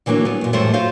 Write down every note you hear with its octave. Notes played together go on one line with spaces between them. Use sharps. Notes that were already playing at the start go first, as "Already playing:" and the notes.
D3 E3 F#3 A#3 D4
G3 B3
F#2 A#2
F#2 A2 E3 G3 A3 C5
F4 F#4 C5 F5